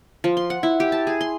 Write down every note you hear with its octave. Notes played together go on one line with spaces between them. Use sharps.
F3
C6
F#5
E4
G4
A5
G#4
C6